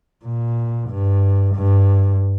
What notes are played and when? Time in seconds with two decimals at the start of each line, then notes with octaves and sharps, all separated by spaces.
0.25 A#2
0.90 G2
1.54 G2